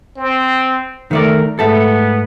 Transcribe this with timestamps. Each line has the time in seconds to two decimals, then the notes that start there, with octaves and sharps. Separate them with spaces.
0.16 C4
1.11 D#3 A3 A#4 D5
1.59 G#2 A3 B3 A4